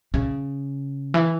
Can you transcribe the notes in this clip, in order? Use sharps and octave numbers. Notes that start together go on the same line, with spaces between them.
C#3
E3